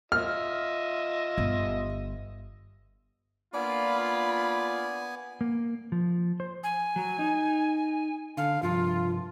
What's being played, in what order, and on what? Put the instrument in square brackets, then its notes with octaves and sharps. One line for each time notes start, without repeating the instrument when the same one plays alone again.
[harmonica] F4 D#5 E5 [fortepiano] F6
[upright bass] G1
[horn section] A#3 D4 F4 [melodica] B3 G#5 [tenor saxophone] D5 [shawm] B5
[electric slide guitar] A#3
F3
C5
[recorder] G#5
[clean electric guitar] F#3
D#4
[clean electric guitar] D3 [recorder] F5
[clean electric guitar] C2 G2 F3 [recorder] F4